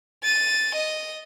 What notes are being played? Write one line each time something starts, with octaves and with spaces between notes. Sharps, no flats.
A6 D#7
D#5